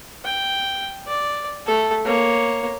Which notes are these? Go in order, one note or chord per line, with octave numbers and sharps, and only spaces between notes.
G5
D5
A3 A4
A#3 C#5